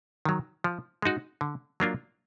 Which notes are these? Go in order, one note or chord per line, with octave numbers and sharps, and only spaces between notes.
D#3 F#3
F3
G#3 D#4 F#4
D3
F#3 A#3 D4 F4